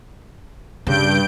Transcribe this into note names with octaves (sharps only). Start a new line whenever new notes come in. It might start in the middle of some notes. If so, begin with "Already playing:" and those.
G2 C#3 G6 D7